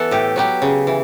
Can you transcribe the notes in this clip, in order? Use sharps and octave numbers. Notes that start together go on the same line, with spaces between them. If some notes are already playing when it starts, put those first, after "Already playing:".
Already playing: E3 B3 A4
A2 G4
F#3 B3 G4
C#3
E3